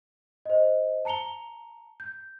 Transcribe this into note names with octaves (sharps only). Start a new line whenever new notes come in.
C5 D#5
A5 A#5 C#7 F7 G7
G6